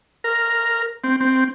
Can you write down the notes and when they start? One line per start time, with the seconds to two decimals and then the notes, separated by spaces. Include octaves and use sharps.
0.24 A#4
1.04 C4
1.21 C4